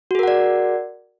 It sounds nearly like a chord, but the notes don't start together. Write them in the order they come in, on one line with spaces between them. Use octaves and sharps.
F#4 G#4 A#4 F#5 D5